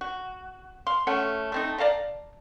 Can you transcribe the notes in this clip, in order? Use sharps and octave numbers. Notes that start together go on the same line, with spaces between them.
F#4
F5 C6
A3 C#4 F#5
A3 C4 D#4
D5 F5 A5 A#5